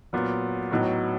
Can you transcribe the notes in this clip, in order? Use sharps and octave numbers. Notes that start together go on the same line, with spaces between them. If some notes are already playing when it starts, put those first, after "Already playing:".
A#2 F#3 B3
A2 F#3 B3 D#4 F#4